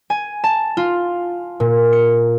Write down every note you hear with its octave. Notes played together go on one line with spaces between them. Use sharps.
G#5
A5
F4
A#2
C#7